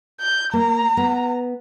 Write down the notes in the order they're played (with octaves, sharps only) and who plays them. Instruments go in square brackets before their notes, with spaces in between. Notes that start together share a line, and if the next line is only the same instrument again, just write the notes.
[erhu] G6
[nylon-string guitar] A#3 [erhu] A#5
[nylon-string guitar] B3